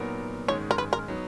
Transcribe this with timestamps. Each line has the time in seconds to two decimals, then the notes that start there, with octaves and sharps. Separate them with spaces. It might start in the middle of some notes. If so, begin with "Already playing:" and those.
Already playing: A#2 F#3 B3 D#4 A#4
0.48 G#2 D#3 G#3 C#4 C#5
0.71 A#4
0.78 B4
0.93 A#4
1.08 F#3 B3 D#4